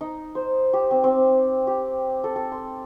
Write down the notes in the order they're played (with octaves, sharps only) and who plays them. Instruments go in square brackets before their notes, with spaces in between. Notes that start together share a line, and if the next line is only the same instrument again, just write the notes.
[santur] D#4
C5
G4
C4
C4
G4
A4
A4
C6